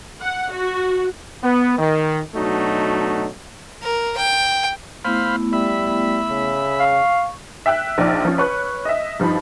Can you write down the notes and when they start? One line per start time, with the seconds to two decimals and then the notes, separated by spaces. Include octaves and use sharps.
0.22 F#5
0.52 F#4
1.43 B3
1.78 D#3
2.34 B2 F#3 A3 D4 D#4 F#4
3.82 A#4
4.17 G5
5.05 A3 B3 E4 C5 F5 B5
5.53 G3 E5 B5
6.29 C#3
6.80 F5 C#6
7.66 E5 G5 E6 F#6
7.98 A#1 F3 D#4 D5 F6
8.25 F3 C#4
8.38 B4 C#5 C#6 F#6
8.85 D#5 E5
9.20 G2 F3 D#4 B5